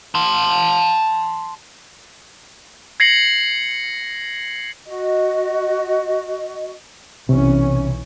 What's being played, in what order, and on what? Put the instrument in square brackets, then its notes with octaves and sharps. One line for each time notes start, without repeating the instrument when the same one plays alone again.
[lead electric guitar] A5 C6
[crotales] G#6 A#6 C7 C#7 F#7
[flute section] F#4 D#5
[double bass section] B1 E3 C#4 [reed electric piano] C3